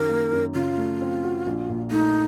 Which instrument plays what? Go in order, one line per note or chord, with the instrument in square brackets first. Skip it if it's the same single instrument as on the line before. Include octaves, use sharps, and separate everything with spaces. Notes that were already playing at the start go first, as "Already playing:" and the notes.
Already playing: [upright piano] F#2 D#3 [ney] A#4
[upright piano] A#3
F#2
[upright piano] C#3 [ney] F4
[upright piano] A3
C4
F#4
A#1
A#2
[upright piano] A3 [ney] D#4